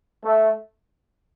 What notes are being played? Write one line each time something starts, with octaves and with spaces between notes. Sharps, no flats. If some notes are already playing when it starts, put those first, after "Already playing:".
A3